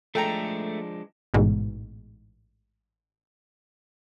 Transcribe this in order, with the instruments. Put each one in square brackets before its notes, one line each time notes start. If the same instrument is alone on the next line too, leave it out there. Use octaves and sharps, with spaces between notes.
[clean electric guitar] F3 G#3 D4 [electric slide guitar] A3 [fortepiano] A4 G5 A#5
[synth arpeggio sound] A1 G#2 B2